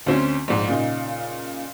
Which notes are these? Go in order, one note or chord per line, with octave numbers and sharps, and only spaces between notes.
D2 C4 C#4
A#1 G#2
A#2 C#3 D#4